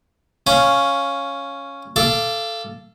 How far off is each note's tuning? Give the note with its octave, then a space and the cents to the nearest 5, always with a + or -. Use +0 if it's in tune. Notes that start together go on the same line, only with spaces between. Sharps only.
C#4 +0 F5 +0
A4 +0 F5 -25 D6 +0